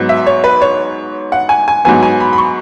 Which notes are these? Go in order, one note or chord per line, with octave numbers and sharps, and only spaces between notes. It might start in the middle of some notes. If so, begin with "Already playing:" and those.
Already playing: G#2 F#3 B3
E5
C#5
B4
C#5
F#5
G#5
G#5
G#2 F#3 B3 G#5
G#5
B5
B5
C#6